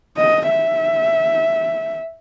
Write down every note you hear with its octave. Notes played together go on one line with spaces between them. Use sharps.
D#5
E5